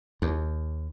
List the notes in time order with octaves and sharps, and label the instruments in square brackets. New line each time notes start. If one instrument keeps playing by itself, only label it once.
[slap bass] D#2